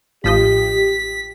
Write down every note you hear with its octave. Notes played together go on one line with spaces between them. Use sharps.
A1 F3 G4 D#5 B6